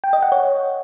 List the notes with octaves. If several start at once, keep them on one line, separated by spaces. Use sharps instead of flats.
G5
D#5
F#5
C#5